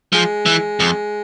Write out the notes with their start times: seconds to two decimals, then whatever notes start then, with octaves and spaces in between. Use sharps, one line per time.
0.13 F3 G#3
0.46 E3
0.80 F2